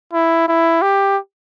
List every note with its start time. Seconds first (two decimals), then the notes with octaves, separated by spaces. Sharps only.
0.13 E4
0.48 E4
0.82 G4